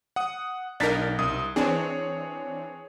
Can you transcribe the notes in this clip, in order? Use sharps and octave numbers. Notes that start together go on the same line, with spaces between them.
F#5 D#6
B1 D4 D#4 A#4 A6 B6
C2 D#6
E3 C4 D4 G#4 C#5